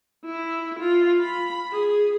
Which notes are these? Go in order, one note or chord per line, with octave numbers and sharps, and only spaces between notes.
E4
F4
B5
G#4